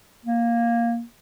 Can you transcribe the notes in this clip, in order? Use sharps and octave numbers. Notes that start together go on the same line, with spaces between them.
A#3